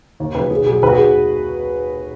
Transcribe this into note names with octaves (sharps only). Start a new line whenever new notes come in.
D#2
C#3 F#3 B4
B1 G#4
B2 F#3 G#4
D#2 B4
F#4
G#4